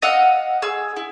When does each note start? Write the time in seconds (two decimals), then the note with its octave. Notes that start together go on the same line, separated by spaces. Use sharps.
0.02 D#5 F5 F#5 E6
0.62 G#4 E6
0.96 E4